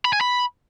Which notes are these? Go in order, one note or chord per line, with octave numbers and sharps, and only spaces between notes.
B5
G#5
B5